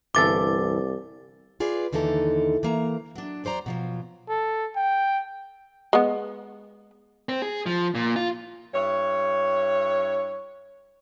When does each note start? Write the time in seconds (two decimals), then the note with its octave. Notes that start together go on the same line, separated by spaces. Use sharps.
0.15 G1 C2 E3 A4 D6 A6
1.60 F4 G#4 B4 D5
1.93 D#2 D3 E3 D#4 A4
2.63 E3 A#3 A#5
3.15 F#3 D4
3.44 E2 F#3 C5 D5 A#5
3.66 B2 F3 F#3
4.29 A4
4.76 G5
5.93 G#3 B3
7.29 C4
7.42 G#4
7.66 F3
7.95 A#2
8.16 F4
8.74 G2 E4 C#5